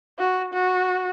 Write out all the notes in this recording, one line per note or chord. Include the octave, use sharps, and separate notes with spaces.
F#4
F#4